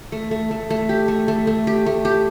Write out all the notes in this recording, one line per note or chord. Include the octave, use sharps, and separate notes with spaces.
A3
A3
A3
A3
G4
A3
A3
A3
G4
A3
G4